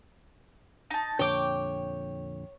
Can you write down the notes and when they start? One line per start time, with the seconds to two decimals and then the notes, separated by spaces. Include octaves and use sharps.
0.91 D#4 A5
1.19 F2 A#2 D3 C#5 G5 D6